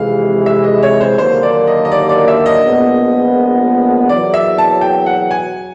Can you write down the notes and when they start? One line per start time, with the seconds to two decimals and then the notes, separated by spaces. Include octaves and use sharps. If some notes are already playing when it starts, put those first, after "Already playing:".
Already playing: F2 C3 E3 G#3 F5
0.46 E5
0.64 D#5
0.83 C#5
1.00 C5
1.18 D#2 D3 F#3 A#3 C5
1.43 D5
1.67 D#5
1.85 D#5
1.92 D5
2.09 D5
2.28 E5
2.46 D#5
2.64 A#1 A#2 F3 G#3 B3
4.09 E2 B2 F#3 A#3 D5
4.34 E5
4.58 A5
4.81 G5
5.06 F#5
5.31 G#5